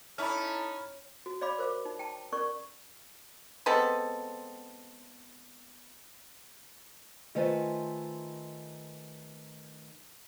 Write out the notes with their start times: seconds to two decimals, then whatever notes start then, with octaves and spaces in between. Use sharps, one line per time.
0.18 C#4 D#4 E4 A4 B5 F6
1.26 F#4
1.41 C#5 D5 F5 B5 D6
1.58 A#4 C5 F5 D6
1.85 D#4
1.99 G5 A5 A#5
2.32 C#4 A#4 D5 C#6
3.66 G#3 B3 C4 A4
7.35 D#3 A3 F4 B4 C5 G#5